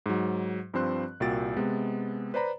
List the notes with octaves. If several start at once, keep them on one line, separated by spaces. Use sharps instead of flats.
G#2 F#3
G2 F3 C4 C5 C6 F#6
C2 A#2 F#4 G5 A6 D7
C3 G#3 B3
B4 C5 D5 A#5 B5